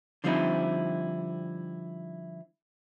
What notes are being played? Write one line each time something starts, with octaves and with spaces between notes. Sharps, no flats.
D3 F3 G3 C4 D#4 E4